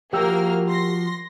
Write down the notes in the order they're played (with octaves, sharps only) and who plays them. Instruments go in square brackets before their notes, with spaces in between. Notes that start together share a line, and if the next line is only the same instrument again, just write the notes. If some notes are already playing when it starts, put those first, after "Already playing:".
[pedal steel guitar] F3 F#4 [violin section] A#3 A#4 F6 [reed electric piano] G4 G5 E6
[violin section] C6 A#6